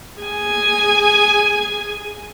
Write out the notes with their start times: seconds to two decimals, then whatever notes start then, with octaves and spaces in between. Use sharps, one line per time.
0.21 G#4 G#5